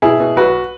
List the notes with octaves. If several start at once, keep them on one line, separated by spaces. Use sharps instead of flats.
B2 E4 G#4
B2
B1 F#4 B4